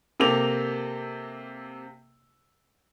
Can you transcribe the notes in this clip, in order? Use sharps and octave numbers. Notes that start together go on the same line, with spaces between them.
C3 A#3 C4 A4 D6 F7